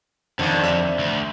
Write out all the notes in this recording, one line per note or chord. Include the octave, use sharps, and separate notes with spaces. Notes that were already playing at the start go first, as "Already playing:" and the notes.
F2 D3 D#3 F3
E5
D2